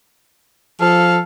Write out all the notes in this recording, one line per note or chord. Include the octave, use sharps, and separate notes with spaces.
F3 A4 F5